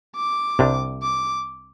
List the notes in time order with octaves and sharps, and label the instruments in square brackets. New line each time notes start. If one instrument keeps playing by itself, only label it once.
[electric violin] D6
[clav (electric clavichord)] C2 C3 G3 D4
[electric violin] D6